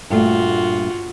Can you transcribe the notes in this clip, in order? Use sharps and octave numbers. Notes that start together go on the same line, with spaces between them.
G2 A#2 A3 F4 F#4